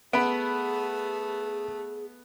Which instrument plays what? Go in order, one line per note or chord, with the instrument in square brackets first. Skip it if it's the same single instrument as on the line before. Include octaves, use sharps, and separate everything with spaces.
[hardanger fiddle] A3 [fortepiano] B3 [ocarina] G#4 [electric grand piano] B5 D7